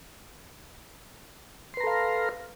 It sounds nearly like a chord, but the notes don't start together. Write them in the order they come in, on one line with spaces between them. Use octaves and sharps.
C6 B4 A#5 A4 F5